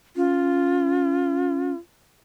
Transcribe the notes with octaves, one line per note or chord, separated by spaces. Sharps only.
C#4 F4